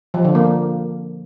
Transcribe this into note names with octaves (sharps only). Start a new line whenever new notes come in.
F3
D3
A#3